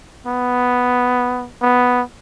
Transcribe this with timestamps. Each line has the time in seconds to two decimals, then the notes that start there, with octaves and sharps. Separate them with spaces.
0.27 B3
1.62 B3